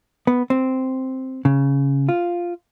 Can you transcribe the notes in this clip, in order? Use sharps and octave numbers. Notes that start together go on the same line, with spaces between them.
B3
C4
C#3
F4